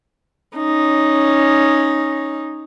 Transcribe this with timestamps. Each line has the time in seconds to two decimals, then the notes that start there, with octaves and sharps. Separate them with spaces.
0.57 C#4 D#4